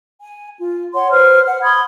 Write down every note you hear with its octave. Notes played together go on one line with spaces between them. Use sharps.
G#5
F4
C#5 F#5 C6
B4 C5 F6
F#5
B5 C6 D#6 G#6